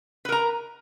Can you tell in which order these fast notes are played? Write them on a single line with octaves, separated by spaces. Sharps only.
B4 A#4 A#5